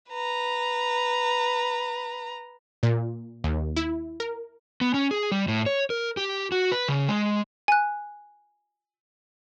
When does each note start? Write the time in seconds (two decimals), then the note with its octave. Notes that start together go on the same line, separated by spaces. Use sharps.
0.10 B4 A#5
2.83 A#2
3.44 D#2
3.76 E4
4.20 A#4
4.81 B3
4.94 C#4
5.11 G#4
5.32 G3
5.48 A2
5.66 C#5
5.90 A#4
6.17 G4
6.52 F#4
6.72 B4
6.88 C#3
7.08 G#3
7.68 G#5 F#6